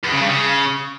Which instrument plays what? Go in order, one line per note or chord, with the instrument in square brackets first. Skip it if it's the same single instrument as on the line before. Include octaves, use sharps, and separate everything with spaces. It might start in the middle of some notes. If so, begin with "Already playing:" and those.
[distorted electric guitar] E2
C#3
G2
C#3